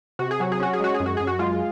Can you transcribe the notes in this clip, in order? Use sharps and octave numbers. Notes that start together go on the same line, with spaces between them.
C3 F#4
G#4
F#3 F#4
G#4
C#4 F#4
G#4
G#3 F#4
G#4
F#2
F#4
F#2 G#4
F#4
G#3 F4